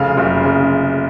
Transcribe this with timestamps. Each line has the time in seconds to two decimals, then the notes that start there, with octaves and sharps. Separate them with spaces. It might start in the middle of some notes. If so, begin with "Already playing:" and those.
Already playing: F1 C#3 F5
0.17 F#1
0.44 C#3